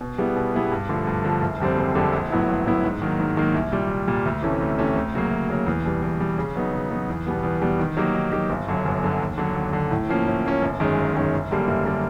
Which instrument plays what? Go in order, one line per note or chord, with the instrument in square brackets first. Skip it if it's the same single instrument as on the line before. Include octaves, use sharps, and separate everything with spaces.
[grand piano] B2
G3 B3 E4 G#4
B2
G3 B3 E4 G#4
G2
D3 F3 A3
G2
D3 F3 A3
F#1
F2 D3 G3 C4
F#1
F2 D3 G3 C4
A#1
A2 F#3 B3 E4
A#1
A2 F#3 B3 E4
G#2
D#3 F#3 A#3
G#2
D#3 F#3 A#3
C2
A#2 G3
C2
A#2 G3
D2
C3 E3 A3 C#4
D2
C3 E3 A3 C#4
D2
C#3 F#3 A#3
D2
C#3 F#3 A#3
E2
B2 G3
E2
B2 G3
C#3
F#3 B3 D#4
C#3
F#3 B3 D#4
E2
B2 G3 B3
E2
B2 G3 B3
D#3
F#3 A#3 D#4 G4
D#3
F#3 A#3 D#4 G4
G1
F#2 D3 F#3
G1
F#2 D3 F#3
D#2
D3 F#3
D#2
D3 F#3
A2
F3 A#3 C#4
A2
F3 A#3 C#4
G1
F#2 D#3 G#3 C#4
G1
F#2 D#3 G#3 C#4
F#1
F#2 D3 G3 A#3
F#1
D3 G3 A#3